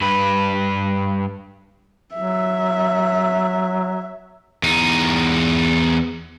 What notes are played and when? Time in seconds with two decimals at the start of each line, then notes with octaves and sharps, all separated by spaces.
0.01 G2 B4
2.14 F#3 E5
4.63 E2 D#4